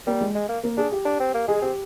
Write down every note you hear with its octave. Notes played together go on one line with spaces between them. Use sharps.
G3 A#3
G#3
G#3
A#3
A#3
D4 G#4
G4
D4
C4
A#3
G#3 G#4
C4 G4